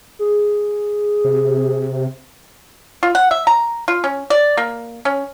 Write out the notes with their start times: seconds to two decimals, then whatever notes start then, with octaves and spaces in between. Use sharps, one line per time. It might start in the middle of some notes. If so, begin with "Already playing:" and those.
0.19 G#4
1.24 C3
3.03 F4
3.15 F#5
3.31 E5
3.47 A#5
3.88 F4
4.04 C#4
4.30 D5
4.57 A#3
5.05 C#4